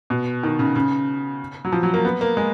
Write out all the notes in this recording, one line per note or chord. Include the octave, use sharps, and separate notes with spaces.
B2
D#3
C#3
C#3
F#3
F3
F#3
A#3
B3
A#3
G#3